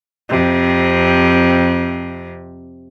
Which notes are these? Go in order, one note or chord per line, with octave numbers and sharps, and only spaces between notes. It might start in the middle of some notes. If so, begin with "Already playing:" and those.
F2 C3